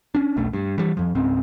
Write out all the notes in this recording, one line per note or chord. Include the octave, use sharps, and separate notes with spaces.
C#4 D4
E1 B1 B2 A3
G2
E3 G3
F2 F3
C#2 G#2 C#3 C4